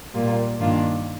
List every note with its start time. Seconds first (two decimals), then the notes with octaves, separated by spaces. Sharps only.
0.14 A#2 G3 A#3 F4
0.59 G2 D#3 A#3 D4 F4